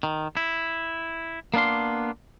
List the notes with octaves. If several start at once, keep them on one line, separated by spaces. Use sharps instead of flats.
D#3
E4
A#3 B3 D4 F5 C6